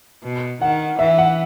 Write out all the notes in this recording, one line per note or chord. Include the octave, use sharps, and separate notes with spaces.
B2
D#3 F#5
E3 E5
F#5